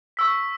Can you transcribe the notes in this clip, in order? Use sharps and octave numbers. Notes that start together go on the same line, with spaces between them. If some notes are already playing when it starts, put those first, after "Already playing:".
C#6 E6 B6